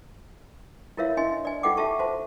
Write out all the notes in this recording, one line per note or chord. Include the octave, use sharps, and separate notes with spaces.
E4 F4 A#4 C#5 E5 F5
D4 E4 D#5 G#5 C6
D5 G#5
D#4 F4 A4 F#5 G5 D6
F4 G4 E5 A5 C#6
F#4 C5 A5